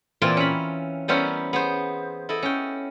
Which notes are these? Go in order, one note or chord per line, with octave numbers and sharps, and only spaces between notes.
A#2 E3 C4 F4 D5
C#4 B5
G3 B3 C#4 E4 A#4 C5
B3 G#4 C5
E4 A4 D#5
C#4 G5